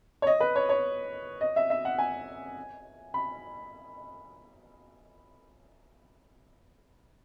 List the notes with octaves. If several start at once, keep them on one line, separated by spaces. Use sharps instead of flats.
C#5
D#5
B4
C#5
C#5
D#5
E5
E5
F#5
G#5
B5